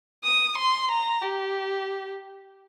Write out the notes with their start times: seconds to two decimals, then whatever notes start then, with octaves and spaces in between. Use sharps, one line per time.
0.25 D#6
0.58 C6
0.91 A#5
1.22 G4